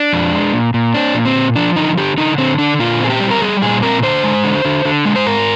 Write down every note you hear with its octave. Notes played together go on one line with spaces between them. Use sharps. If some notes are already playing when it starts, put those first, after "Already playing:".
Already playing: D4
F2
G#3
A#2
A#2
C4 D4
A#2
C4
A#2
F3 D4
D3 D#4
D3 G4
D3 D#4
D3 C4
D3 D4
A#2 F4
C4 G#4
G4
G3
A#4
G3 G#4
A#2 G#4
C4 A#4
D3 C5
G#3
D3
D3
D3
G#3
C5
G#2 A#4